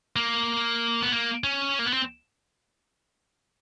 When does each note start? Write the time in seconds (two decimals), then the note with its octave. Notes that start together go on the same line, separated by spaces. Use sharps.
0.16 A#3
1.03 B3
1.12 A#3
1.44 C#4
1.79 A#3
1.86 B3
1.93 C4